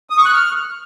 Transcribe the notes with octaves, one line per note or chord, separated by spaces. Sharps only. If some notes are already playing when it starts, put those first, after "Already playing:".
D#6
C#6
F#6
F6